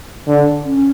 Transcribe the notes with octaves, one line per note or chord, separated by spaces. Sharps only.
D3
C#4